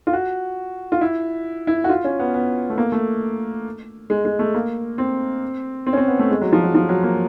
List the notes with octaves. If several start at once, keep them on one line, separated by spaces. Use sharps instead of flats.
F4
F#4
F4
E4
E4
F#4
F4
C#4
B3
B3
A3
A#3
A3
G#3
G#3
A3
A#3
C4
C4
C#4
C4
B3
A3
G#3
F#3
F3
F#3
F3
F#3
A#3